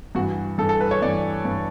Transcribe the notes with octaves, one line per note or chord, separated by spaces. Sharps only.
G2 E3 F#4
G2 E3 A4
A4
B4
C#5
G2 E3 D5
G2 E3